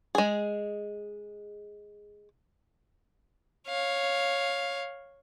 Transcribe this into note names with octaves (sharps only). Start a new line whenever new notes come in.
G#3 G#4
C#5 F5